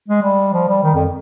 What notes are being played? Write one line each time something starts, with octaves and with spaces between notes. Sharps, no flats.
G#3
G3
F3
G3
D#3
F2